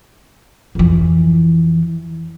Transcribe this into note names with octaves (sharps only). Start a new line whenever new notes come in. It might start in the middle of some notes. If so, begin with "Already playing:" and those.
F2 E3